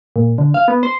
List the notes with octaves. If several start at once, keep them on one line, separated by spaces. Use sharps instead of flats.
A#2
D3
F5
B3
C5